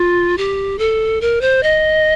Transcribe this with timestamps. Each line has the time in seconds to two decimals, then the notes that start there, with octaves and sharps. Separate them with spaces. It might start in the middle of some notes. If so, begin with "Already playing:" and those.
Already playing: F4
0.38 G4
0.79 A4
1.21 A#4
1.41 C5
1.63 D#5